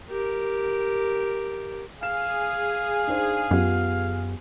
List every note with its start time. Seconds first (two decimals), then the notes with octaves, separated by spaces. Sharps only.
0.10 G4 A#4
2.03 G#4 F5 E7
3.07 D4 D#4 C5
3.51 F#2 B3 F4 G4